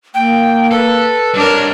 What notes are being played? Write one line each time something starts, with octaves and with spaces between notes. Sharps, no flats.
A#3 G5
A4 B4
F2 G3 D4 A#4 C#5